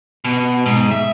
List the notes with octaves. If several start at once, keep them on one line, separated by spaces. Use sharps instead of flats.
B2
G#2
E5